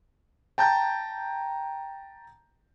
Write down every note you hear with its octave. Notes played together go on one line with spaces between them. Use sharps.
G5 A5 A#5 G6